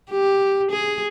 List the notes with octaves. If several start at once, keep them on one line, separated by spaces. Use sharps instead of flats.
G4
G#4